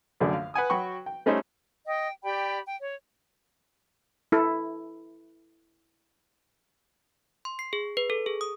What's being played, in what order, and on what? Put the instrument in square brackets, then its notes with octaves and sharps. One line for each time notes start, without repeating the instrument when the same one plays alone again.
[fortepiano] A#1 F#2 D3 A3 D5
F5
B4 F#5 G#5 D#6
F#3 F#4 G5 B5 C#6
G5
G3 A3 C#4 D#4 C5 E5
[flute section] D#5 G5
G4 D5 G5 B5
G5
C#5
[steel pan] E4 A4
[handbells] C6
C7
G#4
B4
A4
G#4
D#6